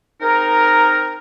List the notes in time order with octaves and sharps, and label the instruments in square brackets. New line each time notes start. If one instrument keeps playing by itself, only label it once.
[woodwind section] C4 D#4 G#4 A#4